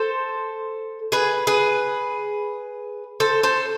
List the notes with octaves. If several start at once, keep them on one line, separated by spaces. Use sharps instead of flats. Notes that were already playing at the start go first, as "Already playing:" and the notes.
Already playing: A4 C5
G#4 B4
G#4 B4
A4 C5
A4 C5